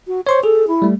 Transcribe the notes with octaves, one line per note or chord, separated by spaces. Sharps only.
F#4
C5 C#5 C6 C#6
G#4 A4
E4
G3 A3